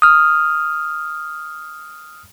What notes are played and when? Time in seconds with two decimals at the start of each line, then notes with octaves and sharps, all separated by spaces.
0.02 D#6 F6